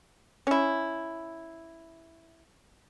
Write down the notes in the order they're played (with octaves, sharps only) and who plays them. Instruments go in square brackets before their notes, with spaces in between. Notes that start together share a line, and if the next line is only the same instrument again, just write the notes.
[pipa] C#4 E4